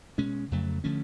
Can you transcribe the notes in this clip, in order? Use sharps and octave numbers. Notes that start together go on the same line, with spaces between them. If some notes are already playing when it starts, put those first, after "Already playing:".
B2 G#3 C#4
F2 C#3 F#3 A3
D3 F3 A3 C#4